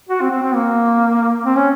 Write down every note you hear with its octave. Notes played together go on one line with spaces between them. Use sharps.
F#4
C4
C4
C4
A#3
C4
C#4